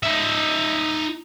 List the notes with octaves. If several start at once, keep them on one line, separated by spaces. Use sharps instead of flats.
D#4 E5